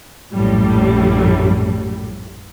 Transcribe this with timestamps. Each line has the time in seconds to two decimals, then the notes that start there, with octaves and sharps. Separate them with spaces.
0.33 A#1 F#2 A2 G3